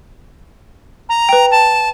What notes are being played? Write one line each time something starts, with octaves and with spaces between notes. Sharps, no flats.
A#5
B4 G5
A5